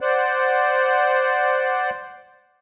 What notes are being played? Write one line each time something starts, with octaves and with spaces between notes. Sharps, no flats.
C5 D5 F#5